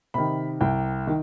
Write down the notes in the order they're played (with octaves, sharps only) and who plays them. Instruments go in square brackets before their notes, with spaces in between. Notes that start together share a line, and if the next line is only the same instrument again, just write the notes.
[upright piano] C3 D#3 B5
C2 G5
D#3